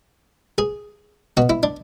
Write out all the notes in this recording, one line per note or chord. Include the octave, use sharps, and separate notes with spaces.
G#4
B2 F#4
E4
D4